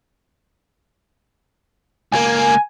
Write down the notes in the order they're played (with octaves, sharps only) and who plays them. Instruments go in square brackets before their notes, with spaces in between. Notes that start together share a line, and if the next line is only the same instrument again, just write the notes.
[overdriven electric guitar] C#2 A#3 [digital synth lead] G#5